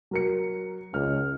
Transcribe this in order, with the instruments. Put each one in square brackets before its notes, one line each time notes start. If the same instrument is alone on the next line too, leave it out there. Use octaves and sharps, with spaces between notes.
[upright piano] F#3 A#4 C#7
[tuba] C#2 [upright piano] F6